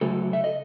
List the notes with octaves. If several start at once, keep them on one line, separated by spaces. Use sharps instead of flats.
C#3 F#3 A3 A4
E5
D#5